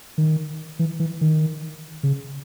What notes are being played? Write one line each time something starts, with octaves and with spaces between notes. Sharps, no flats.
D#3
E3
E3
D#3
C#3